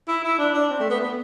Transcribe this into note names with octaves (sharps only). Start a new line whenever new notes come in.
E4
E4
D4
D4
C4
A3
B3
B3